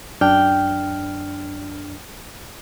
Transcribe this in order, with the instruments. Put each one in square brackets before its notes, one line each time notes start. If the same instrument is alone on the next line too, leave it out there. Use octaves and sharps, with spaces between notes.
[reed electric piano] F#2 D4 F6 [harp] G5